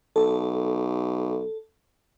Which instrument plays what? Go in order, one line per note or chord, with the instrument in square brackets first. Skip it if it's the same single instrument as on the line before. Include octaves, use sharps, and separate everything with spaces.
[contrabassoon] B1 [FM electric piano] A4